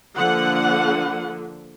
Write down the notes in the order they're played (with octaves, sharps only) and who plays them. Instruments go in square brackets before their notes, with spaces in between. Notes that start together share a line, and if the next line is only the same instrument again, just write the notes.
[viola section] D3 F3 A#3 F#5